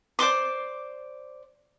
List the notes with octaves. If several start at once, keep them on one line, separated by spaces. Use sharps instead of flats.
C5 D5 C6 D6